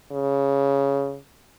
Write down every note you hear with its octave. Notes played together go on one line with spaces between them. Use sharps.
C#3